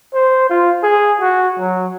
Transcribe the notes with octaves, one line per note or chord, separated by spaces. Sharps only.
C5
F4
G#4
F#4
F#3